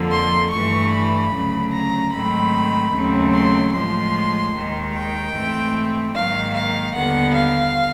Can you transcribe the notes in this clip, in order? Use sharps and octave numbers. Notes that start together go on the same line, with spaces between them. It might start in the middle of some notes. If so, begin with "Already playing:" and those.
Already playing: F2 D3 F3 A#3
C6
G2 E3 A3 C#6
B5
D2 C#3 F#3
A#5
G#2 D#3 F#3 A3 C4 B5
D#2 C#3 F#3 A3 C4
C6
A2 F3 G#3 C6
D#2 D#3 G#3
G5
G#2 E3 A3 C4
G#2 D#3 F#3 A#3 F5
F5
D#2 D3 G3 B3 F#5
F5